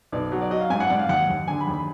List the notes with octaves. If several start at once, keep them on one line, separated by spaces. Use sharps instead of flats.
B1 D5
F#3
D5
F#3 D#5
F5
G#2 G#5
F#5
G#2 D5
F5
D#2 F#5
D#2
D3 G#5
B5
D#2
B5